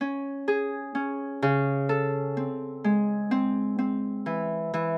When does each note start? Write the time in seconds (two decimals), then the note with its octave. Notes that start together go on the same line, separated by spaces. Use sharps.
0.01 C#4
0.48 G#4
0.95 C#4
1.42 C#3
1.89 A4
2.37 C4
2.84 G#3
3.31 C4
3.79 C4
4.26 E3
4.74 E3